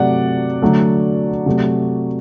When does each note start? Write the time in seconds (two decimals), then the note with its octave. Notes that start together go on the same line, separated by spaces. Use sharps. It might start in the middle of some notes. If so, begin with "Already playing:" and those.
Already playing: C3 F#3 A3 D5 F#5
0.62 D3 F#3 A3
1.46 C3 F#3 A3